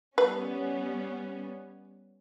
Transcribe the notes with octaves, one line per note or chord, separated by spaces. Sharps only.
G3 B3 C#4 B4